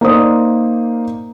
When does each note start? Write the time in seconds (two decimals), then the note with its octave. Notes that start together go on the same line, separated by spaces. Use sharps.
0.01 A#3 D#4 A#4 C5 D5 D#6